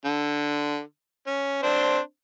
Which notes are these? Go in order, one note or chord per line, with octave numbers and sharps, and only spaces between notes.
D3
C#4
C4 D4 C5